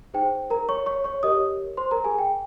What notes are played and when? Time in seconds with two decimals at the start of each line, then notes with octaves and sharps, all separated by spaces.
0.14 D#4 G#4 C5 G5
0.50 A#4 A#5
0.69 C#5 C#6
0.86 C#5 C#6
1.04 C#5 C#6
1.23 G4 A#4 C#5 D#5 D#6
1.77 C5 C6
1.91 A#4 A#5
2.04 G#4 G#5
2.19 G5